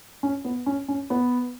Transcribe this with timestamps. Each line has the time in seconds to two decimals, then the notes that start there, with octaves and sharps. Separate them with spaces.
0.23 C#4
0.45 B3
0.66 C#4
0.88 C#4
1.10 B3